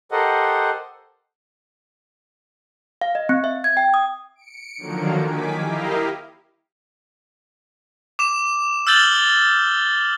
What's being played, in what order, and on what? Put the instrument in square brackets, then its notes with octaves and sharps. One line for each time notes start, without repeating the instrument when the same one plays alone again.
[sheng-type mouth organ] G4 A4 A#4 C5 D#5 F#5
[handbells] F5
D#5
C4
E5
G#6
G5
D#6
[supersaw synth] C#7 D7
D3 D#3 F3 F#3 A#3
D#3 G#5 D6 B6
E4 G4 A#4 D#5 F5
[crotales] D6 E7
E6 F6 G6 A6 F#7 G7